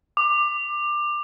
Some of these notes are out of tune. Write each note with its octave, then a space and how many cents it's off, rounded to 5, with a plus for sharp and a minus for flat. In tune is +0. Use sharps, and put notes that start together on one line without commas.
D6 +20